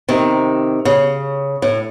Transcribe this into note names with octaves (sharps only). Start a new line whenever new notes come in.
C3 D#3
C#3
A2